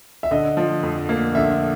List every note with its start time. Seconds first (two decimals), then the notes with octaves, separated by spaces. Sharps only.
0.23 E5
0.31 D3 D#5
0.57 F3
0.83 F2
1.09 A#3
1.35 D3 E5